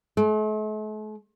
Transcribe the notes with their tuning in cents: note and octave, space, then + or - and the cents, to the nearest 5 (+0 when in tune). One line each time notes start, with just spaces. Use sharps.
A3 -45